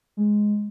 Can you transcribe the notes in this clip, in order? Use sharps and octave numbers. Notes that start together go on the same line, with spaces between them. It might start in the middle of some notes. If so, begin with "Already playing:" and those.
G#3